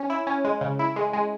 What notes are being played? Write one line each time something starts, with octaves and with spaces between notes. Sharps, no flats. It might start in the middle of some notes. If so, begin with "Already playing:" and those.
Already playing: C#4
E4
C#4
G#3
C#3
E4
G#3
G#3